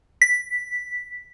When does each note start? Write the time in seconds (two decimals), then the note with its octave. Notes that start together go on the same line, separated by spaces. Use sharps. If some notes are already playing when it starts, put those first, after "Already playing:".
0.22 B6